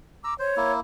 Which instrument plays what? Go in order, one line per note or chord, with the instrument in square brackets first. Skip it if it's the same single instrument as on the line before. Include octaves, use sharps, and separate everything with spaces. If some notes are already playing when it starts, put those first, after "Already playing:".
[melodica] A#5 E6 [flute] D6
[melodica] C5 [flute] C#5
[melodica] A#3 E4